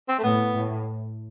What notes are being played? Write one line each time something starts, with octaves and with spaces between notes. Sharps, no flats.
C4
A3
A2 B3
A2